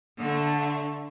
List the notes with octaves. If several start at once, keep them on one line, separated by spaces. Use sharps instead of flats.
D3 A3